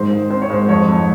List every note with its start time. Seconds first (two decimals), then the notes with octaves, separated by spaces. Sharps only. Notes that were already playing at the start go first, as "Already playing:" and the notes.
Already playing: G#2 D#3 C5
0.11 G#2
0.30 C4 C5
0.42 C#5
0.50 G#2 C5
0.69 F2 C#5
0.88 F2